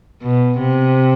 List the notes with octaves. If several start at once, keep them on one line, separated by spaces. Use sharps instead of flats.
B2
C3